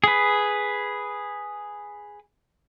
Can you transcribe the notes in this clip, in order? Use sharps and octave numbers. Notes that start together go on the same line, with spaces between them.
G#4 B4